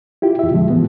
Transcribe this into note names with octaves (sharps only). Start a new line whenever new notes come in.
E4 F4 G4
E2 E5
B2 D3 F3 G#3
A2 E3 B3